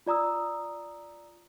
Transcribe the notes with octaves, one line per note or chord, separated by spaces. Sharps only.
F4 D5 A#5 D#6 E6